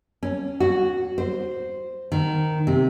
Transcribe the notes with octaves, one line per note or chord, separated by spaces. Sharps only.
C#4
F#4
C5
D#3
C3